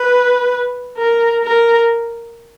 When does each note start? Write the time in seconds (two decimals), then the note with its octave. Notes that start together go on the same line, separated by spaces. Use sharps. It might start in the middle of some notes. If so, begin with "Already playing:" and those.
Already playing: B4
0.97 A#4
1.43 A#4